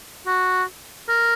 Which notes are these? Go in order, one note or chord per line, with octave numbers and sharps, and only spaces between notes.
F#4
A#4